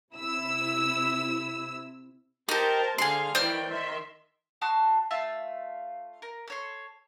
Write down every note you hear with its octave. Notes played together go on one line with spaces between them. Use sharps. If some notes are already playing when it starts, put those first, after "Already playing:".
C3 E4 E6
D#4 G4 A#4 C5 A5
D3 G#4 F5 C6
D#3 E3 C5 D5 G5 F6
D#3 E5 C6
F#4 A5 C6 D#6
A3 F4 E5 A5
A#4
A4 C#5 C6